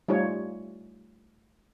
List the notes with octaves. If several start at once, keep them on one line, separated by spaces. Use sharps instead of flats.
G3 A3 D#4 F4 C#5